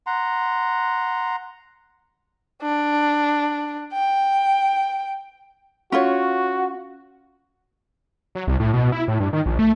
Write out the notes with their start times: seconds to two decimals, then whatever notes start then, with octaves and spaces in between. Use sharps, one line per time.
0.07 F#5 A#5 C6
2.62 D4
3.93 G5
5.92 C#4 F4 F#4 C#5
8.35 F#3
8.47 C2
8.60 A2
8.73 B2
8.92 E4
9.08 A2
9.20 G2
9.33 D#3
9.46 A#1
9.59 A3